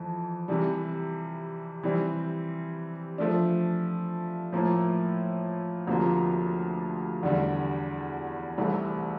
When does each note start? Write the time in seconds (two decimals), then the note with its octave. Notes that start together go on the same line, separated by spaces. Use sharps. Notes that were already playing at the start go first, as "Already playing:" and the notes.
Already playing: F2 E3
0.48 C3 E3 G3
1.83 C3 E3 G3 C4
3.18 F3 A3 D4
4.52 A2 F3 A#3 E4
5.87 D2 C3 F3 A#3 F4
7.23 E2 D3 G3
8.58 C2 C3 E3 A3 C4